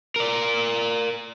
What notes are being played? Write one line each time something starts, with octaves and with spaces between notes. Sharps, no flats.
A#4 D5